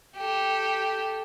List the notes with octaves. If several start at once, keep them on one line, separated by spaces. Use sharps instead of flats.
G4 A4